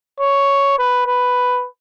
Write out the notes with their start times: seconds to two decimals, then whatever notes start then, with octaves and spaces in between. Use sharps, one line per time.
0.20 C#5
0.78 B4
1.07 B4